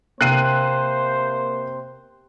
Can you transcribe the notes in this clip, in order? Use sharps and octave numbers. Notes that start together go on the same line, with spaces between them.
C3 A#3 C5 F#6 C7 D#7